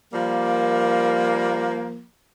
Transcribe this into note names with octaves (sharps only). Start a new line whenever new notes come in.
F3 G3 A#3